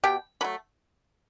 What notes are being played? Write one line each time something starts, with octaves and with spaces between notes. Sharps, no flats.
B2 G4 G5
F#3 A3 B5